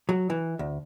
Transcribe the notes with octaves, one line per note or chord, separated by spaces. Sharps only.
F#3
E3
D2